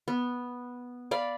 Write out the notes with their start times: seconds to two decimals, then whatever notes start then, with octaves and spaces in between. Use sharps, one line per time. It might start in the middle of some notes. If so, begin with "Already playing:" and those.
0.08 B3
1.11 D5 F5 B5